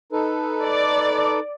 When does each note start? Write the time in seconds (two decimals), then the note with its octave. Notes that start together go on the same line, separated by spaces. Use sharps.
0.12 D#4 A4 B4
0.64 D5